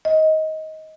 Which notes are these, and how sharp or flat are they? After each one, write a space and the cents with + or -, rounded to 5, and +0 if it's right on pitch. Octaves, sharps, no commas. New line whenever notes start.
D#5 +15